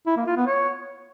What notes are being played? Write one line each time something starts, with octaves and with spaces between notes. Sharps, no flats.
E4
A#3
F4
B3
C#5